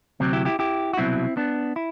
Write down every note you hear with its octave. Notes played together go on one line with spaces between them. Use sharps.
D2 C3 F#3 C4
E4 G4
E4 G4
E4 G4
F#4
C2 B2 F#3 C4 E4
B3 D4
E4